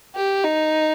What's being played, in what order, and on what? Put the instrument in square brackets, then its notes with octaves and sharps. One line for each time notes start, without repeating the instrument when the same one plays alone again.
[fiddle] G4
D#4